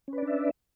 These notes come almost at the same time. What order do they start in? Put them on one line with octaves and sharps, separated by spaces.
C#4 B4 D5 D4 E5